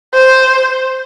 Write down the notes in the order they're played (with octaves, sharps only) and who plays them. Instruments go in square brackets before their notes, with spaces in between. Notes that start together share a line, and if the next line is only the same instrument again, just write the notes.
[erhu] C5